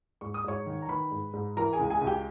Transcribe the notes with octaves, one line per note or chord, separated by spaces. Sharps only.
G#2 C#6
D#6
G#2 C#5 C#6
D#3
A#5
D#3 B4 B5
G#2
G#2
E3 A#4 A#5
G#4 G#5
C#2
G#4 G#5
C#2
G4 G5